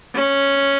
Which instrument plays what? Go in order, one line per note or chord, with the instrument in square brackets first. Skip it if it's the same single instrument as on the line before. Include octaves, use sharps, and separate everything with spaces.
[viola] C#4